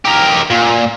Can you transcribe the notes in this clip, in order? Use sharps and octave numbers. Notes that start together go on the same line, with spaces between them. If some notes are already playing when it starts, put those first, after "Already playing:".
G4 A#4
A#2